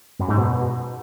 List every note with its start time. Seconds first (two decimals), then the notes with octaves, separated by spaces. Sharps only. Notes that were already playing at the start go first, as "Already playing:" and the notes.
0.19 F#2
0.28 G#2
0.37 B2